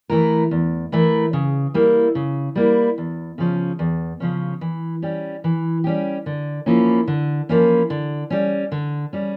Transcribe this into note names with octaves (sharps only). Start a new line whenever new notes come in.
E3 A3 E4 A#4
E2
E3 A3 E4 A#4
C#3
G3 A#3 E4
C#3
G3 A#3 E4
E2
C#3 F3 C#4
E2
C#3 F3 C#4
E3
G3 C#4 G4
E3
G3 C#4 G4
D3
F3 A#3 C#4 E4
D3
F3 A#3 C#4 E4
D3
G3 C#4
D3
G3 C#4